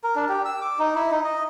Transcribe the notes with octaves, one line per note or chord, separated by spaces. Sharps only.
A#4
D4
G4
E6
D6
D#4
E4
D#4
D#5